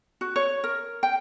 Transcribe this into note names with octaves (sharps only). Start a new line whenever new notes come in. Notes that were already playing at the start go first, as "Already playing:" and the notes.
F#4
C#5
A#4
G5